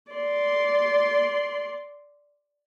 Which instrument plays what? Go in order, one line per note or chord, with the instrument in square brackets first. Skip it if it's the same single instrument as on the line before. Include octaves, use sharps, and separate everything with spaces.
[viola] D5 C6